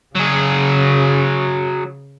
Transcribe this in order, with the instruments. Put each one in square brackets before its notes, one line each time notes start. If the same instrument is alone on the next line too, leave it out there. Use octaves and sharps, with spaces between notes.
[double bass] C#3 [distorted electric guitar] F#3 G#4